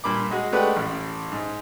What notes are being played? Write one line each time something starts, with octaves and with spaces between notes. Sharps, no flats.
G2 A#2 B5 D6
G#3 F#4 G#4
G#3 A3 G4 B4 D5 F#5
A1 A2
G#2